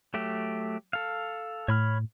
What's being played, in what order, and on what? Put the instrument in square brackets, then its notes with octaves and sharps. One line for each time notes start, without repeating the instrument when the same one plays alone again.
[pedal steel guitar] F#3 A3 G4
A4 F5
[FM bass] A2 [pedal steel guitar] C#5 B5 F6